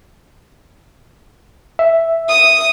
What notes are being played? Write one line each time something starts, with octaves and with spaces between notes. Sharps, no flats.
E5
D#6